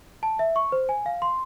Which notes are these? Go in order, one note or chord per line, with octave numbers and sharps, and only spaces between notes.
A5
E5
C#6
C5
G#5
F5
C6